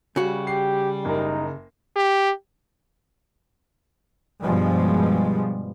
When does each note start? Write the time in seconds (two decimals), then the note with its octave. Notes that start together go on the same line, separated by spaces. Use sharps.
0.16 C#3 G3 F#4
0.47 G4 C7
1.05 F#1 D#4 A#4
1.96 G4
4.43 G2 B2 F3 G3 G#3